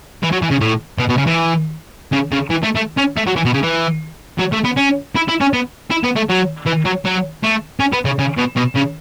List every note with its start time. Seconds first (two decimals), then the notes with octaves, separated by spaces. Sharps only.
0.23 E3
0.32 F#3
0.42 E3
0.51 C#3
0.61 A2
0.99 B2
1.09 B2
1.18 C#3
1.27 E3
2.12 C#3
2.32 C#3
2.50 E3
2.64 A3
2.76 A3
2.98 C#4
3.17 A3
3.27 F#3
3.36 E3
3.45 B2
3.54 C#3
3.63 E3
4.39 F#3
4.53 A3
4.65 B3
4.77 C#4
5.16 E4
5.29 E4
5.41 C#4
5.54 B3
5.91 E4
6.04 B3
6.16 A3
6.30 F#3
6.66 E3
6.85 F#3
7.05 F#3
7.43 A3
7.80 C#4
7.93 B3
8.05 C#3
8.19 C#3
8.38 B2
8.57 B2
8.76 C#3